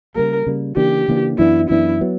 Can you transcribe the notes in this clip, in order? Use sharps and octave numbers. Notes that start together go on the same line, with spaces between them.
C#3 G3 A#3 A#4
C#3 G3 A#3
C#3 E3 A#3 D4 G4
C#3 E3 A#3 D4
F#2 E3 B3 D4 E4
F#2 E3 B3 D4 E4
F#3 B3